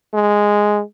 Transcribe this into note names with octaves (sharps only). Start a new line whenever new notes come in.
G#3